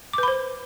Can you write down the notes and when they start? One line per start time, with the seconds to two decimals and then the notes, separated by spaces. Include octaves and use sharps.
0.13 D6
0.18 B4
0.23 B5
0.28 C5